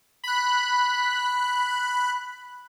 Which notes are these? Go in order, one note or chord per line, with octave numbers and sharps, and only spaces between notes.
B5 F#6